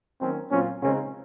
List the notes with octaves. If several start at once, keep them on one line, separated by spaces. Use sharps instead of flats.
D#3 F#3 A#3 C4 C#4
A#2 F#3 C4 C#4 F4
C#3 G#3 C4 C#4 D#4